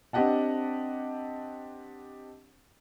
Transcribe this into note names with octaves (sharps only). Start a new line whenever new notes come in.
C4 D4 G4 D#5 F#5 A5